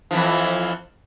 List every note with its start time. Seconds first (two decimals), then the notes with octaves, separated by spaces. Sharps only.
0.11 F2 E3 F3